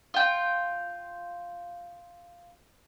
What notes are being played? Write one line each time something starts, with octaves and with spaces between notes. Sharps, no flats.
F4 G5